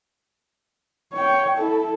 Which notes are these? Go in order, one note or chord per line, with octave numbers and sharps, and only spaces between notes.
C#5 G5
E4 A4